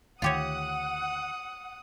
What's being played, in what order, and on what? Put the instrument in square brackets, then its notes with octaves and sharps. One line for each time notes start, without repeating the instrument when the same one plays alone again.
[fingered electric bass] D2 D#3 [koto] F4 G4 C#5 [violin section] F#5 [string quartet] D#6